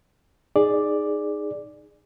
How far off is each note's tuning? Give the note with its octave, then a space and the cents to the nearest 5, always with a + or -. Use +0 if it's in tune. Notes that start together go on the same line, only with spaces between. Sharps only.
D#4 -10 G#4 +0 D5 +0